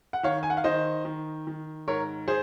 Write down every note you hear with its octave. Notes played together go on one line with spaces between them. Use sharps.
F#5
D#3 C#5 F5
G#5
F#5
F5
D#3 C5 D#5
D#3
D#3
G#2 A#4 C#5
G#4 C5